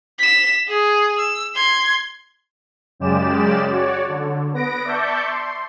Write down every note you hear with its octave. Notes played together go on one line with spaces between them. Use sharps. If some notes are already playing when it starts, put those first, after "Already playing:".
B6 E7
G#4
E6
C6 G#6
F#2 C#3 G#3 G4 D5 E7
F#4 C#5 D5
D3
B3 B4 A#6 D7
D5 E5 A5 C#6 G6
C6